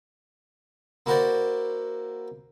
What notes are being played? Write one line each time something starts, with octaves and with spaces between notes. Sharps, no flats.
A#3 E4 F#4 A#4 C5 D5